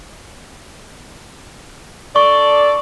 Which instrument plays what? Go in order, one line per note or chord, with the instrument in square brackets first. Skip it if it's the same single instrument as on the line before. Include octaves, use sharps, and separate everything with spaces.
[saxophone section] D4 A4 D5 [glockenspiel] C#6